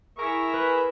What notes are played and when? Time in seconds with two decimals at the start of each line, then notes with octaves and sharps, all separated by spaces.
0.18 E4 G#4 A#4 E5 C#6
0.54 B4